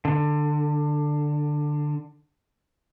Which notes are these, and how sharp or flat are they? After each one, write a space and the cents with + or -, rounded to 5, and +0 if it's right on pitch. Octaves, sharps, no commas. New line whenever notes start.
D3 +15